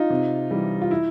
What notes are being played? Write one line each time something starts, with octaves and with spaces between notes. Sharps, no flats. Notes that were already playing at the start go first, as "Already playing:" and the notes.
Already playing: D#4 F4
C3
E3 G3
F4
E4